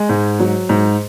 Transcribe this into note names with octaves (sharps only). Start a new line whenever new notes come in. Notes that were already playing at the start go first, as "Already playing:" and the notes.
Already playing: G#3
G#2
F#3
G#2